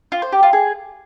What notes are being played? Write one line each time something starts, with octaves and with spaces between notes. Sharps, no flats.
F4
C5
G4
F4
G#4